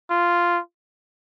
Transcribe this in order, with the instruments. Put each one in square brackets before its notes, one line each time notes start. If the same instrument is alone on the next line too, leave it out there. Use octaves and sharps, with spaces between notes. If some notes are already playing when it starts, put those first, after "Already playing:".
[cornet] F4